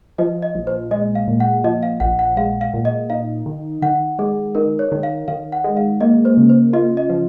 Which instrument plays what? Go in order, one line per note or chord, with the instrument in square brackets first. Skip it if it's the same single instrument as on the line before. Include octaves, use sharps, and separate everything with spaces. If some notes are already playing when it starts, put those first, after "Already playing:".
[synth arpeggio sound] F3 [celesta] D#5
[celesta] D#5
[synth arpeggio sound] A#1
[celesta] C5
[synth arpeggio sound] G#3 [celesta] D#5
[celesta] F5
[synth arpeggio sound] A#2
[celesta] F#5
[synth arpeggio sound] F3 [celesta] D#5
[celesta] F5
[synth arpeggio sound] A#1 [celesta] F#5
[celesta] F#5
[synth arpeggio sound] G#3 [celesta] F5
[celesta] F5
[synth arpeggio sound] A#2
[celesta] D#5
[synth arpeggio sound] D#4 [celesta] F5
[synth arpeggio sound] D#3
[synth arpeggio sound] D#3 [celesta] F#5
[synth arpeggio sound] G#3 [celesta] G#4
[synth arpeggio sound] D#4 [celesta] A#4
[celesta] C#5
[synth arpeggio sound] D#3
[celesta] F5
[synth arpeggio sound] D#3 [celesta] F5
[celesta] F#5
[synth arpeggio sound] G#3
[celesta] F5
[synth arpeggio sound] A#3 [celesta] D#5
[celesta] C5
[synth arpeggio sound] C#3
[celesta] C5
[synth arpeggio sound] F4 [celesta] D#5
[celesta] D#5
[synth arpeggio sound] F3